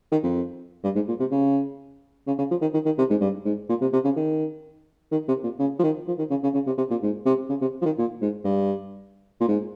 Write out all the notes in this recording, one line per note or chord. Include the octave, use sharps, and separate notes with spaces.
D#3
F2
G2
G#2
A#2
C3
C#3
C#3
C#3
F3
D#3
D#3
D#3
C3
G#2
G2
G#2
A#2
C3
C3
C#3
D#3
D#3
C3
A#2
C#3
F3
D#3
F3
D#3
C#3
C#3
C#3
C3
C3
A#2
G#2
C3
C#3
C3
F3
D#3
A#2
G#2
G2
A#2
G#2